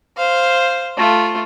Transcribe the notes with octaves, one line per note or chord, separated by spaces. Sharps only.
C5 F5
A3 F4